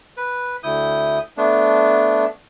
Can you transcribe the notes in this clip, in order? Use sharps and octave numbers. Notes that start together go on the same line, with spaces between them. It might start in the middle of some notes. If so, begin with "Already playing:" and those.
B4
D2 E4 D#6 G6
A3 B3 D4